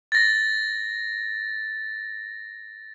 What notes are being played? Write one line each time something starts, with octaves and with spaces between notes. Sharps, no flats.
A6 A#6